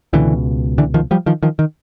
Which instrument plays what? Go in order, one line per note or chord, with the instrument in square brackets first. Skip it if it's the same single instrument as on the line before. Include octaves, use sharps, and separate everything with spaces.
[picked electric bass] C#2 B2 D3 E3
D3 E3
D#3 F3
F3 G3
D#3 F3
D#3 F3
D#3